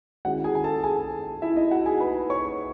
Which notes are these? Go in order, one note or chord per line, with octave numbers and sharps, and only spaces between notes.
D#3 G#3 C#4 E4 F#4 F#5
G#4 G#5
G#5
A4 A5
G#4 G#5
E4 E5
D#4 D#5
F#4 F#5
G#4 G#5
B4 B5
C#5 C#6